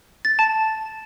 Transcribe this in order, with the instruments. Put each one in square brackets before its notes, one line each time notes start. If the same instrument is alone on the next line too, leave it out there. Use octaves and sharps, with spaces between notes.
[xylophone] A6
A5